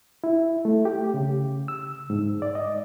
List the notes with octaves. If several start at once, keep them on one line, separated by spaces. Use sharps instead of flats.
E4
A3
G4
C#3
E6
G#2
D5
D#5